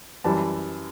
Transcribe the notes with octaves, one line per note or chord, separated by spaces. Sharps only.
F#2 E3 G3 A5